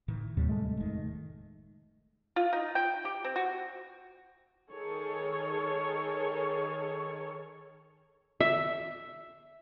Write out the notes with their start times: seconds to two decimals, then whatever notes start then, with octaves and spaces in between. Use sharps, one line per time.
0.08 A2 D#3 E3
0.37 D#2 A2 C3 G3
0.49 G#3 A3
0.77 F1 D#3
2.36 F4
2.53 D#4
2.75 G5
3.05 G4
3.24 C4
3.36 F#4
4.71 D#3 G#4 A4 C#5
8.40 E5